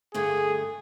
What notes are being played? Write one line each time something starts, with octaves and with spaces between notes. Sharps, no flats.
G2 D3 A3 G#4